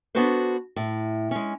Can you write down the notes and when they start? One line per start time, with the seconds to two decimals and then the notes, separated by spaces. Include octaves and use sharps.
0.15 B3 D4 F#4 A4 B4 C5
0.76 A2
1.31 G#3 C#4